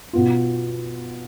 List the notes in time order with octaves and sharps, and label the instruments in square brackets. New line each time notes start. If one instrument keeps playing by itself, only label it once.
[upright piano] B2 B3 F4